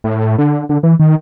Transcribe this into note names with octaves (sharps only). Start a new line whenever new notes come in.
A2
D3
D3
E3
D#3